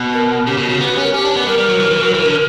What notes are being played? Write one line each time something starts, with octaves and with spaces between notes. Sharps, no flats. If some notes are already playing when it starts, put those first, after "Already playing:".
Already playing: B2
A#4
C#3 G4
B2
G4
C#3 F#4
B3 G4
G4
C#4
A#4
C#4 G4
D4
B3
G3 A#4
G3
F#3
E3
E3
F#3
E3
D3